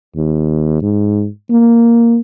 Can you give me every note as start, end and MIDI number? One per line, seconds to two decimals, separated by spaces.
0.16 0.81 39
0.82 1.27 44
1.50 2.18 58